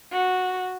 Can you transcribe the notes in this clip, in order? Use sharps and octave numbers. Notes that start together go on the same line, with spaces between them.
F#4